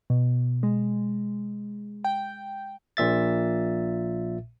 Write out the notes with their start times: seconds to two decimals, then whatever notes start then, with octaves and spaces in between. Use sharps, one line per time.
0.10 B2
0.63 G#3
2.04 G5
2.97 A#1 A#2 E5 A6